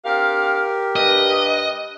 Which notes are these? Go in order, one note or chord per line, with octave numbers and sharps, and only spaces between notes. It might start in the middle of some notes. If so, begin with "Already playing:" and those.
C4 D4 G4 A#4 F5
G2 G3 B4 D#5